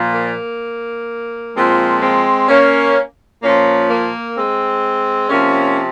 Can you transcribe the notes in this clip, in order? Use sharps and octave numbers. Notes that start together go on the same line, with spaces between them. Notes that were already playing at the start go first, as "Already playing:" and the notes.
Already playing: A#2 F3
A#3
A#2 F3 G#3 C4
G#3 C4
A#3 C#4
A#2 F3 A#3 C#4
A#3
G#3 C4
C3 F3 A#3 C#4